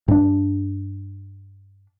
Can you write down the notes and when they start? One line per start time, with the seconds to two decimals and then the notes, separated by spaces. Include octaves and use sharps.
0.08 G2 D4